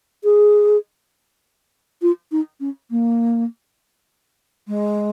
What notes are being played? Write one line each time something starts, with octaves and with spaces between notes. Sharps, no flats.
G#4
F4
D#4
C#4
A#3
G#3